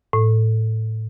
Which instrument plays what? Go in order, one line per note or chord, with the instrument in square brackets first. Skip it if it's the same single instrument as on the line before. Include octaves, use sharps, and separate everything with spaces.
[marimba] A2